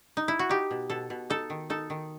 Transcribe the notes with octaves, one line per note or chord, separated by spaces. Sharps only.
D#4
E4
F#4
D#4 G4
B2
B2 A4
B2
D#4 A4
D#3
D#4 A4
D#3